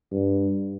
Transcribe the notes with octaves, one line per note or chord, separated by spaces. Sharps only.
G2